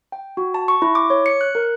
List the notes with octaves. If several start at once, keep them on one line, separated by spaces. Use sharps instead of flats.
G5
F#4
A5
C#6
E4
D6
C#5
C#7
F#6
A#4